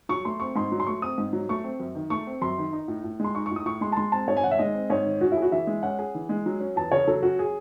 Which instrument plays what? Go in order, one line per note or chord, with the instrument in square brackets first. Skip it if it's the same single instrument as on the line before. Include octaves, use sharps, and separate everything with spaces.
[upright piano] F#3 [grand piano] C#6
[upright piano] A3 [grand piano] C6
[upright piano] C4 [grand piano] C#6
[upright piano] G#2 [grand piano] C6
[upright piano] F#3
[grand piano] C6
[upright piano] A3 [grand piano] C#6
[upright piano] C4 [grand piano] D#6
[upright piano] G#2
F#3
[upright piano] A3 [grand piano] C#6
[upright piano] C4
F#2
D#3
[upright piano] A3 [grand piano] C#6
[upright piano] C4
[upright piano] F#2 [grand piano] C6
[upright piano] D#3
D#4
A2
A2
[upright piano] G#3 [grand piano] C6
[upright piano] D#4 [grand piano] C#6
[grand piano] C#6
[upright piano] A2
[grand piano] D#6
[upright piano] A2 [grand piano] C#6
[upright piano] G#3 [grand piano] C6
[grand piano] A5
[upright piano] G#3 [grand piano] C6
[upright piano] C4 [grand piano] A5
[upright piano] G#2 [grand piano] C#5
[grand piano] G#5
[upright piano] D#3 [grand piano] F#5
[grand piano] E5
[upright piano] G#3 [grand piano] D#5
[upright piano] C4
[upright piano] G#2 [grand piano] C#5
[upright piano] D#3
[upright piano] C#4 [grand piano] F#4
[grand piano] E4
[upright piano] G#4
[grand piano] F#4
[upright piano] E3 [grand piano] E5
[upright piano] G#3
[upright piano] C#4 [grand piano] F#5
[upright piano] G#4
E3
G#3
F#3
C#4
[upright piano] E2 [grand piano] A5
[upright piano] C#3 [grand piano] C#5
[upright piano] F#3 [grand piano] A4
[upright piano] C#4 [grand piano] F#4
[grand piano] G#4